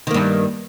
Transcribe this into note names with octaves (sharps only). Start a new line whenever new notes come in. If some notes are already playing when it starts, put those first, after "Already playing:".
G2 D#3 A#3